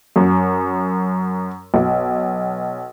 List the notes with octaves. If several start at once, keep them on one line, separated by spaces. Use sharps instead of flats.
F#2
B1